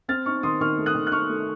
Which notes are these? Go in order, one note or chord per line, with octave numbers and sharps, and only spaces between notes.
C4 F6 A6
D#4 C#6 F6
D#3 C6 D#6
D#3 C#6 F6
A3
D#6 F#6
D#3
F#6
D#4 C#6 F6
A3